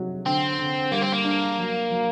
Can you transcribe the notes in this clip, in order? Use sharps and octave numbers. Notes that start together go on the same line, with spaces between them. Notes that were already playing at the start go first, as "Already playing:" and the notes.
Already playing: C3 F#3 D#4
D3 C4
D3
G3 A#3
C4
A#3
D4
F#3
F#3